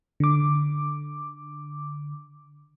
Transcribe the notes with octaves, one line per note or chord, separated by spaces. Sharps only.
D3 D6